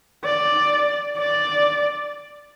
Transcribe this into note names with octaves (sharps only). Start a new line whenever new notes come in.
D5
D5